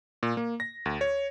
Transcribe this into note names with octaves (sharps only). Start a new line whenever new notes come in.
A#2
A#3
A#6
D2
C#5